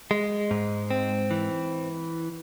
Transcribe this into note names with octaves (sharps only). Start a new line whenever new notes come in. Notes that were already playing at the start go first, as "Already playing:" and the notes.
G#3
G#2
C4
E3